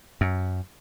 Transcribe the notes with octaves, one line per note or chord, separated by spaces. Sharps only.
F#2